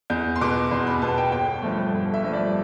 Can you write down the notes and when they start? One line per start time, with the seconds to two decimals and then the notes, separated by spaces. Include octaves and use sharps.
0.10 E2 G6
0.36 C6
0.41 B2 B3 D6
0.71 E2 C6
0.87 B5
1.02 B2 B3 A5
1.18 G5
1.32 G1 G5
1.62 G2 F3 A3
1.94 G1
2.14 E5
2.24 G2 F3 A3
2.33 D5